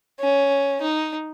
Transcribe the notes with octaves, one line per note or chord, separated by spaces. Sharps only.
C#4
D#4